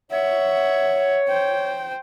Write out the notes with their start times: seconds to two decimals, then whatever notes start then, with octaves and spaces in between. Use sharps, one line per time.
0.11 C#5 E5 F#5
1.29 C5 G5